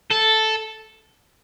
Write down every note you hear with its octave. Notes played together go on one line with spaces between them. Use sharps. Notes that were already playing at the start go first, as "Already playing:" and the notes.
A4